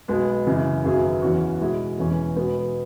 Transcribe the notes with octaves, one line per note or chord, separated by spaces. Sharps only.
B1 B2 G#3 B3
F#2 C#3 E3
G#1 F#2 F#3 B3 G#4
E2 E3 C#4 F#4
B2 G#3 E4 G#4
E1 E2 E3 C#4
B2 G#3 B3